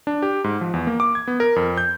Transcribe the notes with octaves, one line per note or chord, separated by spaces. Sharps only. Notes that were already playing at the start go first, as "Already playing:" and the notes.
D4
G4
G#2
F3
E2
A#3
D6
G#6
B3
A#4
F2
G6